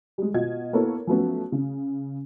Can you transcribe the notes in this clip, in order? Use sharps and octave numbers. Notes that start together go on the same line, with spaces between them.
G3 G#3
B2 F4 F#4 D#5 G#6
A#3 B3 E4 A4 A#4 C#5
F3 F#3 A3 B3 C#4
C#3